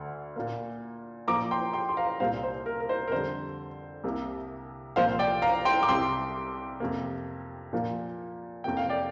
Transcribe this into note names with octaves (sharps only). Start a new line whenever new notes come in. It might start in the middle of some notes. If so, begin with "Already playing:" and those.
Already playing: D2 D3
A#2 A#3
A#2 F3 A#3 A#5 D6
G5 C6
G5 C6
C6
F5 A#5
C2 A#2 G3 A#3 C5 F5
C5
A#4
A#4
C5
A#4
F2 D3 G3 C5
C2 C3 A#3
C2 A#2 F3 A#3 C5 F5
D5 G5
F5 A#5
G5 C6
D6
C2 C3 G3 G5 C6
F2 C3 A#3
A#2 F3 A#3
F2 C3 A#3 G5
F5
D5 G5